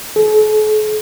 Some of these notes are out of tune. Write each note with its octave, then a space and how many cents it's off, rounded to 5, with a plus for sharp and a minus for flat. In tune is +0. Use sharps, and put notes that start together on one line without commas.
A4 -45